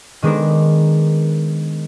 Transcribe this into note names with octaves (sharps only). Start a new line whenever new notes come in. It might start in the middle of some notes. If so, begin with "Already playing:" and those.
D#3 G#3 B3 D4 A#4 C5